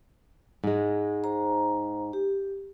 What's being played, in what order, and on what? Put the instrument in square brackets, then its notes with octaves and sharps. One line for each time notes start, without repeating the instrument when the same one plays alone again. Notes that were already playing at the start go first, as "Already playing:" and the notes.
[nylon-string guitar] G#2 G#3
[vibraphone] C5 A#5
G4